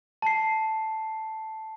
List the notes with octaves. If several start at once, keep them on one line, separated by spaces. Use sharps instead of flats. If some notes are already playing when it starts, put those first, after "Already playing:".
A5 C7